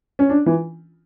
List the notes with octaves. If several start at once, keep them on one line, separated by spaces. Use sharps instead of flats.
C#4
D4
E3